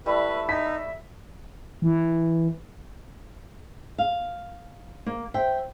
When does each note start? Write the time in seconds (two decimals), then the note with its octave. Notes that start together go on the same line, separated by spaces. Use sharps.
0.06 G3 A3 E4 B4 E5
0.49 D#4 B6
1.82 E3
3.98 F5
5.06 A#3
5.34 C5 E5 G5